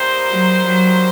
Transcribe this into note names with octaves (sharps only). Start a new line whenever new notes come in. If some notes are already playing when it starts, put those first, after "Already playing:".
Already playing: G3 A#3 D#4 G4 C5
F#3
F#3